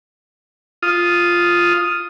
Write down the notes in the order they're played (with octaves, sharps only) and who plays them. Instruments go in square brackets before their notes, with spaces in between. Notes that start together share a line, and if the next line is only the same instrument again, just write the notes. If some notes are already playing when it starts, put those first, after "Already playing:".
[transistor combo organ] F4 D#6